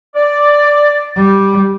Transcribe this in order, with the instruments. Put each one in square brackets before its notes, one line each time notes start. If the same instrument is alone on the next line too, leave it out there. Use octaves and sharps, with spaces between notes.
[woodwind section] D5
[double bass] G3